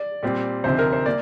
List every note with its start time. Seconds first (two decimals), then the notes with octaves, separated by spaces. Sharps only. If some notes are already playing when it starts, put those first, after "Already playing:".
Already playing: D5
0.23 A#2 G3 C4
0.64 D2 C3 F3 C4 D#4 C5
0.79 A#4
0.93 C5
1.06 A#3 D5